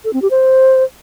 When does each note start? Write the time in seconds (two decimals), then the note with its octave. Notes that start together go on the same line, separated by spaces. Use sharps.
0.05 A4
0.13 C4
0.22 G4
0.31 C5